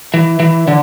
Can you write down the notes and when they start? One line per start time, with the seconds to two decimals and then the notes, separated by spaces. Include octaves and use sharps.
0.14 E3
0.40 E3
0.68 D3